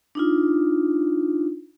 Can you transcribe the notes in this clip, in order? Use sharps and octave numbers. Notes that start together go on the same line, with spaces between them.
D4 D#4 F4